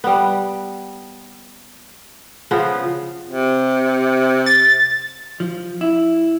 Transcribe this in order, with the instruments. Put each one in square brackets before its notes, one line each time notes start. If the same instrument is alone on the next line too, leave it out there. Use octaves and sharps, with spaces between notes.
[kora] G3 B3
C#3 F3 B3
[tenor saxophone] C3
[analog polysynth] A6
[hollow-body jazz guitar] F3
E4